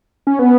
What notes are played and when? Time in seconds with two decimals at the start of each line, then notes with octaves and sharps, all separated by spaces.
0.27 C#4
0.39 B3